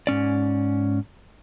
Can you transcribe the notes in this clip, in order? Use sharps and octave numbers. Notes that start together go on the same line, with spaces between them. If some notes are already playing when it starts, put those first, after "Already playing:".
G#2 C#4 D5